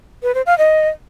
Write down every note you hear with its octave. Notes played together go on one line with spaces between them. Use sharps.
B4
C5
F5
D#5